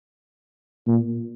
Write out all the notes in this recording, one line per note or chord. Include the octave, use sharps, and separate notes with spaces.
A#2